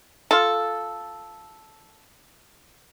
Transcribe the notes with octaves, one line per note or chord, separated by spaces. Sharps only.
F4 A4